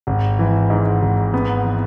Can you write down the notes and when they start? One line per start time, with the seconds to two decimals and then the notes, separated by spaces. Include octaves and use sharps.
0.07 G#1
0.39 E3
0.70 G#2
1.02 G#1
1.34 B3
1.64 E3